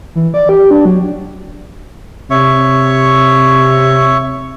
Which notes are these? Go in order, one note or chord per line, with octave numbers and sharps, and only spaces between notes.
E3
D5
G4
D4
F#3
C3 C#5 E5 C#6